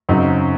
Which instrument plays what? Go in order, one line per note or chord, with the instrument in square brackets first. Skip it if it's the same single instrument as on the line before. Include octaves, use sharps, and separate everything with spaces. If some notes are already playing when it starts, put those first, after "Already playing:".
[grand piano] F#2 C#3 F#3 C4 D#4